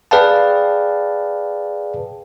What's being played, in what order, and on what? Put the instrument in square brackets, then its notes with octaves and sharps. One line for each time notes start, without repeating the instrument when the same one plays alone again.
[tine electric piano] G#4 B4 D5 F5 G5 A5